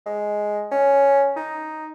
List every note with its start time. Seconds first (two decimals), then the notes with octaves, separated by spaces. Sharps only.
0.06 G#3
0.71 C#4
1.36 D#4